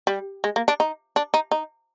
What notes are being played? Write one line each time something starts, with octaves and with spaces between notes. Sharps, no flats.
G3
G#3
A#3
D4
D#4
D4
D#4
D#4